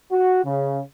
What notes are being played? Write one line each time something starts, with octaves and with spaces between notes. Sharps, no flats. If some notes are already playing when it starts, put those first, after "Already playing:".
F#4
C#3